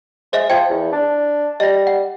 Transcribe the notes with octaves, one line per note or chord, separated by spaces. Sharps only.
G#3 C5 D#5 E5
F3 G5 G#6
E2
D4
G3 D#5 A#6
F#5